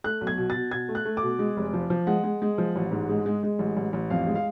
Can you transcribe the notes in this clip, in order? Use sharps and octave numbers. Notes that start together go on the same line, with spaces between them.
A3 F#6
B1
G#6
B2
B2 A6
B2 G#6
A3
F#6
A3
D6
B2
G#3
F1
F3
F3
G#3 F#5
G#3
G#3
F3
A1
G#2
G#3
G#3
G#3
A1
A1
A1
F2 F5
G#3
F5